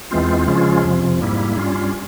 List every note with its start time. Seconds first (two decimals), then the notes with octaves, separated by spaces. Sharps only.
0.11 E2 E3 G#3 C4 F4
0.47 C#3 F3 G#3 C#4 F4
0.84 F2 C3 F3
1.21 G#2 G3 A#3 E4
1.57 G2 G3 C#4 F4